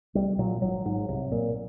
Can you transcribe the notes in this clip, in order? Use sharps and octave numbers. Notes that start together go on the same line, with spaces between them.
C2 G3
A#2 F#3
G#1 F#3
G#2
C2
A#2